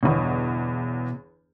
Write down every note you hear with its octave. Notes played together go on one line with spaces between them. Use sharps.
G1 E2 B2